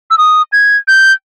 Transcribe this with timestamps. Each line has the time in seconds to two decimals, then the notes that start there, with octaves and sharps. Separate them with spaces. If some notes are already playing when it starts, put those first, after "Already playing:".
0.11 E6
0.18 D#6
0.52 G#6
0.88 G6